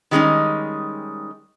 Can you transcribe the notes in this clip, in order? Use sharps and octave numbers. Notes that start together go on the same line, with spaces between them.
D#3 G3 G#3 C4 C#4 D#4